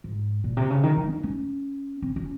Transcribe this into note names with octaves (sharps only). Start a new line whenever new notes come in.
G#2
A#2
C3
C#3
D#3
F3
D#4
C#4
C4
C#4